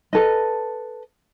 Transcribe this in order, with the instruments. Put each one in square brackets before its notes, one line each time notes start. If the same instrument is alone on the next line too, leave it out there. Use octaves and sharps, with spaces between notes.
[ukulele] A4 B4 D#5